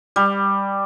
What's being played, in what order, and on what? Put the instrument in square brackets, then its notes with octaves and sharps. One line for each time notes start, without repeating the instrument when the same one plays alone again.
[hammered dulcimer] G3